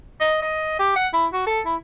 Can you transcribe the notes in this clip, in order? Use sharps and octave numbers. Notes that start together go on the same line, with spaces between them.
D#5
D#5
G4
F#5
E4
F#4
A4
E4